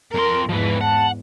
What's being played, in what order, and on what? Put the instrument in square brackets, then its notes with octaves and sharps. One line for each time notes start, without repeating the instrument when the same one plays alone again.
[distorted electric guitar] F2 C6 [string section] A#4
[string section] E2 G#2 [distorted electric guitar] F3 B4
[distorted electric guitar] F#5 [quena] A5